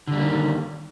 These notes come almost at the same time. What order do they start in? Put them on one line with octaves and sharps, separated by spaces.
D3 G3 A#3 D#3